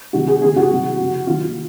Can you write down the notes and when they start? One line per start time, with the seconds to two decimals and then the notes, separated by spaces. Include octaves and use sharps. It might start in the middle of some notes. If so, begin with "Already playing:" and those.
0.13 C2 C3 D#3 F#3 F#4
0.27 G#4
0.42 D#2 C#3 F3 G#4
0.56 F#4
0.70 C2 C3 D#3 F#3
0.98 F#2 C#3 F3
1.27 D#2 D#3 F#3 F4
1.42 F4